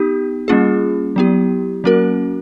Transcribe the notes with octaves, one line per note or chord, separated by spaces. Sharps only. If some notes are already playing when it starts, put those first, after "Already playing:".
Already playing: B3 D#4 G4
G3 A#3 C#4 F4 G#4
F#3 B3 E4 G4
F#3 A#3 C#4 F#4 A#4